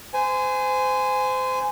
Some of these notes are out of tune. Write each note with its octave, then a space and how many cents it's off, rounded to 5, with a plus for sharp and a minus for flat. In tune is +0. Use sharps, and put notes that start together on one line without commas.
C5 -30 G#5 +0